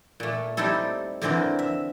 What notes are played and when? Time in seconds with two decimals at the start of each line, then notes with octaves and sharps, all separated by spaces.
0.20 A#2 A3
0.57 G3 C4 D#4 E4 A4
1.22 F2 D3 E3 C4 A#4
1.59 E5